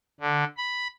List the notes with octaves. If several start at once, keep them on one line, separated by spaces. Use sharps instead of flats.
D3
B5